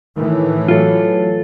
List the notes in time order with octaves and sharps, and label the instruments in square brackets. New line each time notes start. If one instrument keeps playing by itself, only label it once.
[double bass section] A2 E3 [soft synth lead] D#3
[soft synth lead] F#3 [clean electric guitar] F4 A4